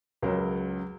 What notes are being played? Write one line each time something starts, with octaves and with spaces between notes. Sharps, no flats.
C#2 C#3 F#3 A#4